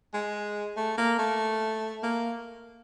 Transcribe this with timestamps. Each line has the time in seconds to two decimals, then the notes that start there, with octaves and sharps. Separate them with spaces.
0.14 G#3
0.77 A3
0.98 A#3
1.19 A3
2.03 A#3